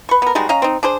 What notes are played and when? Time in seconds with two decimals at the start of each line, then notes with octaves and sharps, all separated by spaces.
0.09 B4 C#6
0.22 B3 A#4
0.35 G3 G#3 D#4 F#4
0.49 C#4 D#5 F5 A#5
0.62 C4 D#4
0.83 D4 G#4 C5